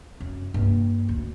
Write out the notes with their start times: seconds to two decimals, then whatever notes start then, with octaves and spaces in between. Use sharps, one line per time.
0.20 F#2
0.54 G2 A#3
1.09 D2